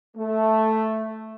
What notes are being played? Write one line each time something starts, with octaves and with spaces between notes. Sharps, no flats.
A3